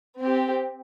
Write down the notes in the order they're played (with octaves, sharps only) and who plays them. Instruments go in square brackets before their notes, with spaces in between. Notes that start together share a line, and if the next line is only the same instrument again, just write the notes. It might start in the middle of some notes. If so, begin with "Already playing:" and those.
[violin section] C4 G4